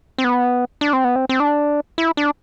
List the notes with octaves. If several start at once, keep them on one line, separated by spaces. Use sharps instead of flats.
C4
B3
D4
C4
B3
C4
C4
D4
E4
D4